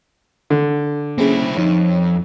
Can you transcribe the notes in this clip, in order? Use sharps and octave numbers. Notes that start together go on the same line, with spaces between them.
D3
A#3 C4 C#4 E4 G#4
F2 D#4 C#5